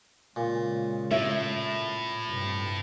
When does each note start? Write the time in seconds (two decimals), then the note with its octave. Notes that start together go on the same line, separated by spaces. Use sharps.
0.36 A#2 C#3 G#3
1.11 A2 E5
2.27 G2 C3